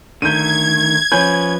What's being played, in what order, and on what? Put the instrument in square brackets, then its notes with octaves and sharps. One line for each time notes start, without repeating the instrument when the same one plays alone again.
[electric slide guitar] D3 D#3 A3 [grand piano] G6 D#7 [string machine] G#6
[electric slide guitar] F3 B4 [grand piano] C#4 G6